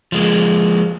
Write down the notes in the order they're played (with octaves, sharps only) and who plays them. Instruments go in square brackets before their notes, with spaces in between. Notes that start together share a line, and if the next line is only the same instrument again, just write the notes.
[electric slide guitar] F3 G#3 A#3